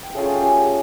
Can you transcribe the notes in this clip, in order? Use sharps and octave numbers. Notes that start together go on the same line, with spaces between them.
G5
A3 C#4 F4 G#4 G#5
G4 G5
G#4 G#5